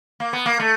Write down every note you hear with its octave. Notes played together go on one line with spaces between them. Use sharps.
A#3
B3
A#3
A3